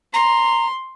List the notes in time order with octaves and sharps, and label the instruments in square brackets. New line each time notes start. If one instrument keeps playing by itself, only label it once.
[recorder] A#5 [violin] C6